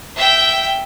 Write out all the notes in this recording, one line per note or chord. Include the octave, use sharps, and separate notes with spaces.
E5 G5